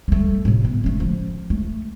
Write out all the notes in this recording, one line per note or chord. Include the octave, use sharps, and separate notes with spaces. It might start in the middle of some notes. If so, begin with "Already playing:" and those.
G3 A3
A2 C3
B3
A3 C#4
F3
A3